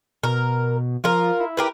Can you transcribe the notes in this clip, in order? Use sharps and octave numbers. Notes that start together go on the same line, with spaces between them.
B2 A#4
F3 F4 A#4
E4
G4 A#4 B4